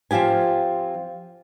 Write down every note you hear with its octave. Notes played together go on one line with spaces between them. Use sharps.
F3 C4 F4 G4 G#5